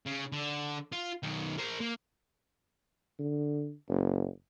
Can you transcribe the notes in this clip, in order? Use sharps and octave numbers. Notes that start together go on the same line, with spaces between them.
C#3
D3
F4
B1 D#3
A#4 C5
A#3
D3
F#1